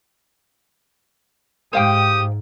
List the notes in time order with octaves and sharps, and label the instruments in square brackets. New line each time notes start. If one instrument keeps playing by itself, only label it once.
[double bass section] G#2 [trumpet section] G4 D#6 [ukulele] C5 F5 G5